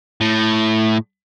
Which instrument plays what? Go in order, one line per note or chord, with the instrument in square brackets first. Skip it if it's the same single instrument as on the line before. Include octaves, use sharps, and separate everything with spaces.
[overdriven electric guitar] A2